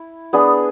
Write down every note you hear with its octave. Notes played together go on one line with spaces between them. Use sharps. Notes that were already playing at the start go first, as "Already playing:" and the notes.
Already playing: E4
B3 D4 G#4 D5